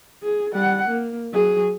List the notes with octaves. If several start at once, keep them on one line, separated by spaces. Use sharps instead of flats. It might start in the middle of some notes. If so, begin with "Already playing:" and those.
G#4
G3 F#5
A#3
F#3 G#4